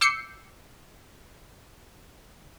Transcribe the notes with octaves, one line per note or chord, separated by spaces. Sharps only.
D6 E6 G6 C7 C#7